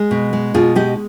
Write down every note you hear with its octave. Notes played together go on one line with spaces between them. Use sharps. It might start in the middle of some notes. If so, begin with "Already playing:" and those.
Already playing: G#3 G#4
B2
G#3
B2 F4 G#4
G#3 D#4 G4